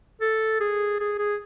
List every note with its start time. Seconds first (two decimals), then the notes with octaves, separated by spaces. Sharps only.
0.21 A4
0.60 G#4
1.00 G#4
1.18 G#4